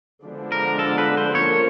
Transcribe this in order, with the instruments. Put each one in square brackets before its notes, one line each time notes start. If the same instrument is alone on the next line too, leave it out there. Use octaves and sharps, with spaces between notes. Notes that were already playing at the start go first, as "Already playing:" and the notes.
[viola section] D3 F3 G#3 B3 D4
[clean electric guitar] A#4
A4
B4
C5
[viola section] F3 A#3 C#4 F4 A#4 [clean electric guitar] C#5